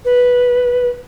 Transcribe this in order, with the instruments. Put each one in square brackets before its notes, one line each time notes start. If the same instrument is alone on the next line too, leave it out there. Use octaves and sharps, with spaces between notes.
[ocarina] B4